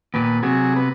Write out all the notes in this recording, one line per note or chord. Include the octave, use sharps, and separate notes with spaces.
D#2 A#2 B3
C3 F#3 G#4
B3